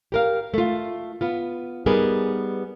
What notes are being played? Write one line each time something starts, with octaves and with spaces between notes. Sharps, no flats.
G4 A#4 F5
A3 F4
B3 F4
G3 B3 D#4 G#4 A#4 B4